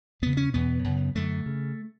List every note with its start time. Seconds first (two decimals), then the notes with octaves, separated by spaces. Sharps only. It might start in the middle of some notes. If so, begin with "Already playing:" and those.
0.22 E2 C#3 B3
0.37 C#4
0.54 E2 B2 B3
0.84 F#2 C#3
1.15 F#2 D3 A3
1.46 C#3